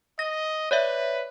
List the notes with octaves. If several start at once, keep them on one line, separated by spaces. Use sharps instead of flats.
D#5 A#6
B4 C#5 D5 E5